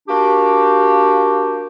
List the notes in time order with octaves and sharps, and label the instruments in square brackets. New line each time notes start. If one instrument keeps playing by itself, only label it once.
[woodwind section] A#3 D4 F#4 G4